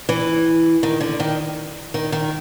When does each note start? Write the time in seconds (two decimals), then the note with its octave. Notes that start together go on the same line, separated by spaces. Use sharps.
0.09 E3
0.83 D#3
1.00 D3
1.20 D#3
1.94 D#3
2.12 D#3